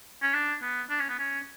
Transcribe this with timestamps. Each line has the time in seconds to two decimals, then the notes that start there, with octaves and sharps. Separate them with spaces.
0.22 C#4
0.33 D4
0.62 B3
0.90 D4
1.00 C#4
1.09 B3
1.19 C#4